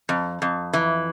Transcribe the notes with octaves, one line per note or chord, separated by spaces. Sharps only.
F2
F2
E3